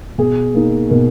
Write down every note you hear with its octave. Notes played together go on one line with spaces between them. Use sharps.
B2 G#4
A#3 D#4
B2 A#4